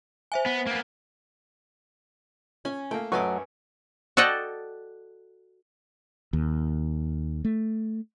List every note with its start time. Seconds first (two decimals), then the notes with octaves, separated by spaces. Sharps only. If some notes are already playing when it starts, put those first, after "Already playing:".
0.32 C5 E5 G#5
0.46 B3
0.67 A#3 B3
2.65 C#4 G#5
2.91 A3 A#3 G5
3.12 F#2 F#3 A3 B4 D#5 G#5 C#6 D6
4.17 F#4 A4 D5 D#5 F#5 G5
6.33 D#2
7.45 A3